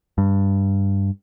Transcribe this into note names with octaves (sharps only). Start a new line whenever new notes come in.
G2